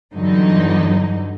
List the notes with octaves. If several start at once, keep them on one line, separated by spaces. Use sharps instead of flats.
E2 G2 D3 E3 F#3 D#4